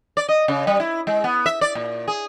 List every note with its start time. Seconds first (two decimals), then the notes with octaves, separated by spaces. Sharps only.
0.17 D5
0.29 D#5
0.48 C#3
0.67 G3
0.80 E4
1.07 G#3
1.24 B3
1.46 E5
1.61 D5
1.75 A#2
2.08 G#4